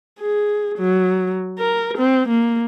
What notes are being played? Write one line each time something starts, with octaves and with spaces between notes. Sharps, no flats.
G#4
F#3
A#4
C4
A#3